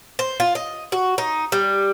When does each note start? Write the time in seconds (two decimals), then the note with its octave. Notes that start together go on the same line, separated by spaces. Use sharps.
0.19 C5
0.40 F4
0.55 D#5
0.92 F#4
1.18 D#4
1.52 G3